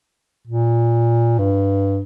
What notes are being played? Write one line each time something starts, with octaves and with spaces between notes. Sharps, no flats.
A#2
G2